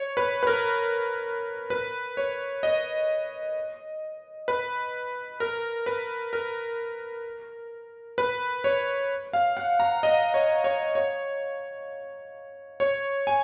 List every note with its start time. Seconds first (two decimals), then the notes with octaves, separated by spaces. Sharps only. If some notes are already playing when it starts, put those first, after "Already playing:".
Already playing: C#5
0.17 B4
0.43 B4
0.47 A#4
1.70 B4
2.17 C#5
2.63 D#5
4.48 B4
5.40 A#4
5.86 B4
6.33 A#4
8.18 B4
8.64 C#5
9.33 F5
9.57 F#5
9.80 A#5
10.03 D#5
10.34 C#5
10.64 C#5
10.95 C#5
12.80 C#5
13.27 G#5